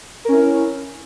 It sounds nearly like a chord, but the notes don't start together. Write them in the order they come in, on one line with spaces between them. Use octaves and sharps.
A#4 C#4 E4